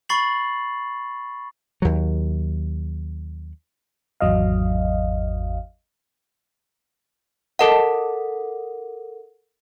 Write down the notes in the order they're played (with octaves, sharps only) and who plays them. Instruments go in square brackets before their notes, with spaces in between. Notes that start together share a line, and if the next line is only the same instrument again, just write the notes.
[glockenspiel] B5 C#6 A6 C7 F#7
[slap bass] D#2 F#3
[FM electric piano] G#1 E2 F#3 D#5 F5
[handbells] A4 A#4 F#5 [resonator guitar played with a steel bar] D#5 A5